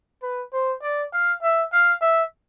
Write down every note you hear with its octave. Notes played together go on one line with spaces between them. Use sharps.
B4
C5
D5
F5
E5
F5
E5